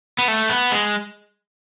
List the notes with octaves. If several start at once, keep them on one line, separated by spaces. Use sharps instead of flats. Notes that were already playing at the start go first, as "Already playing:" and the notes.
B3
A3
B3
G#3